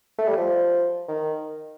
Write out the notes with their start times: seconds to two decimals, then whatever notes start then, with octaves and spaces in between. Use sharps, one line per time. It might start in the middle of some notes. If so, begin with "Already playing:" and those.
0.18 A3
0.28 G3
0.37 F3
1.08 D#3